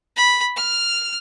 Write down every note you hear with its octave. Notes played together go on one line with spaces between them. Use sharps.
B5
F6